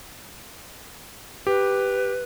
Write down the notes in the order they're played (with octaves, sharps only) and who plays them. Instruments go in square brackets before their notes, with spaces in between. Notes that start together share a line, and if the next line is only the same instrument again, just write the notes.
[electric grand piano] G4 [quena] B4